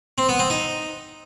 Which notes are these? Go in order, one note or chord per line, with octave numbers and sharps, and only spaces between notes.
C4
B3
C4
D#4